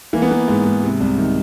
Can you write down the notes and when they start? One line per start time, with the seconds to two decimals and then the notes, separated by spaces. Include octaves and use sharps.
0.13 E3 A#3
0.22 B3
0.31 E3 A#3
0.48 G#2
0.65 G#2
0.83 C3
1.00 C2
1.18 D#3